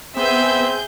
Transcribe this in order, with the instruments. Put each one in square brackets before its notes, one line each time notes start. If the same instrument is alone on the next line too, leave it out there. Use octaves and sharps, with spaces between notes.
[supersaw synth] B3 [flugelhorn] C4 [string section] G#4 G6 [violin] E5